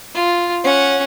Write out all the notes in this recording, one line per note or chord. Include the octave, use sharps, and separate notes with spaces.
F4
C#4 F#5